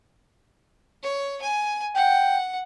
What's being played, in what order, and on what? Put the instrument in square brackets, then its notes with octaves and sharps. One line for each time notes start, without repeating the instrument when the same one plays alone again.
[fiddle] C#5
G#5
[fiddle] F#5 [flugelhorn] G5